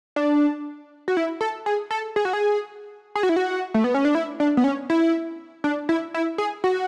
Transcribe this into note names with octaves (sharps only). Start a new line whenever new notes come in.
D4
F#4
E4
A4
G#4
A4
G#4
F#4
G#4
G#4
F#4
E4
F#4
A3
B3
C#4
D4
E4
D4
B3
C#4
E4
D4
E4
E4
G#4
F#4